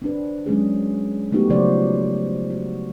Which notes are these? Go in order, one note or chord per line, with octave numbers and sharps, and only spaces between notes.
C4 D4 B4
F#3 G#3 C#4 G#4
F#3 A3 B3 D#4 F#4 G4
C#3 F3 F#3 C5 D5
F#4